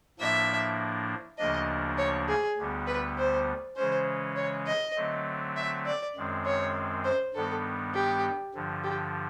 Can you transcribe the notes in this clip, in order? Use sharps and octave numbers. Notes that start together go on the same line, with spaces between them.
A2 F3 A#3 D4 E5
D2 C#3 F3 A#3 D4 D#5
C#5
G#4
D2 D3 G3 B3
B4
C5
C#3 E3 G#3 C#4 C5
C#5
D#5
D3 F#3 A3 C4
E5
D5
F#2 D#3 G#3 C4
C#5
C5
G2 D#3 G3 B3 A4
G4
G2 D3 F3
G4